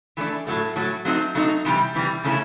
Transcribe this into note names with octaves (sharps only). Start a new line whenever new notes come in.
E3 A3 D4
A2 F#3 A3
A2 F#3 A3
F#3 A3 C4 D#4
F#3 A3 C4 D#4
C3 E3 G3
C3 E3 G3
C#3 E3 A3 C#4 E4